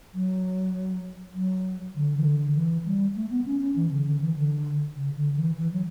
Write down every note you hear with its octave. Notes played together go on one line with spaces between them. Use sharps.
F#3
F#3
D3
E3
D3
E3
G3
A3
B3
C#4
C#4
E3
C#3
D3
E3
D3
C#3
D3
E3
E3
F#3